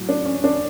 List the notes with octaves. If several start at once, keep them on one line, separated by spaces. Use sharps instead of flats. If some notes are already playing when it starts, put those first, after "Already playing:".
Already playing: A2 F#3
D4
C#4
D4